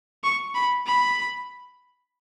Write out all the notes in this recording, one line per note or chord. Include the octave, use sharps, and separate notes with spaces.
C#6
B5
B5